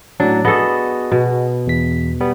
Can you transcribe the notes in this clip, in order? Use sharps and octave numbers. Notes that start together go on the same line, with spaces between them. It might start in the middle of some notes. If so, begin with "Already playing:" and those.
A2 F#3 D4
B3 F#4 G#4 A4 D#5
B2
E2 B6
G3 B3